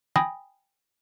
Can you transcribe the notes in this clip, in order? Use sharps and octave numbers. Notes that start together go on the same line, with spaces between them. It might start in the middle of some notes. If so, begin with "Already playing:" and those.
G5 G#5 B5 D#6 A#6